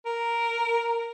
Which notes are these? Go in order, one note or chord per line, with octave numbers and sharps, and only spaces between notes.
A#4